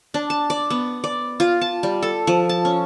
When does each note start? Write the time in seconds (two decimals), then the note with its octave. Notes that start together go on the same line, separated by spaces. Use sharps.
0.14 D4
0.30 A5
0.50 D5
0.70 B3
1.04 D5
1.40 F4
1.61 A5
1.83 G3
2.03 A4
2.27 F3
2.49 A5
2.65 C#4